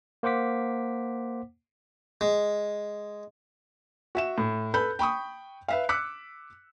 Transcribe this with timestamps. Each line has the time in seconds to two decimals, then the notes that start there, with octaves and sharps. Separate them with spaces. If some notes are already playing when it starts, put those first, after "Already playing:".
0.23 A#3 C5 F#5 D6 B6
2.21 G#3
4.15 F#4 E5 E7
4.38 A2
4.74 A4 B4 B5 G6
4.99 G5 B5 C#6 D#6
5.68 B4 E5 F5
5.89 D6 E6 F#6 B6 C#7